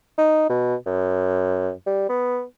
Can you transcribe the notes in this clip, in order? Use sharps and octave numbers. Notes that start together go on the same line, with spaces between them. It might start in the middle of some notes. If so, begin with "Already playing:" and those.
D#4
B2
F#2
G3
B3